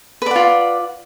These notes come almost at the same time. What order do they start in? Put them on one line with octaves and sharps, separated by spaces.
B4 D5 F#5 F4